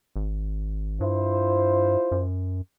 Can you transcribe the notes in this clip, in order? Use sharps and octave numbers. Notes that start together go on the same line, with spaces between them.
G#1
G2 E4 F4 C5
F#2